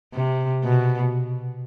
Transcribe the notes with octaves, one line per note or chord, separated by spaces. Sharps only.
C3
B2